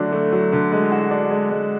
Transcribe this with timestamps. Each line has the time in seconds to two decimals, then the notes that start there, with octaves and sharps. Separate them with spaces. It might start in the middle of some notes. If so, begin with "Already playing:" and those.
Already playing: D3 F#3 A3 D4
0.12 A3
0.32 F#3
0.52 D3
0.72 G#3
0.92 F#4
1.11 D4
1.30 G#3
1.50 G#3